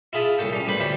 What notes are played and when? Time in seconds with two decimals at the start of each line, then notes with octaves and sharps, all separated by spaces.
0.13 E4 F4 G#4 E5 G#5 A5
0.38 C2 A#2 A4 C#5 G5
0.53 G3 C#4
0.67 A2 G3 B4 C5 B5
0.80 D2 G3 E4 C5 C#5 B5